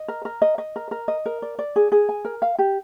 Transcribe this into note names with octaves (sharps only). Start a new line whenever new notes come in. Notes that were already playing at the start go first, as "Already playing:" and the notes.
Already playing: D#5
A#4
A#4
D#5
D#5
A#4
A#4
D#5
A#4
D5
D5
G#4
G#4
G#5
A#4
F5
G4